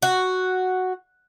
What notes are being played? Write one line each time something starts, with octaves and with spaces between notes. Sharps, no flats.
F#4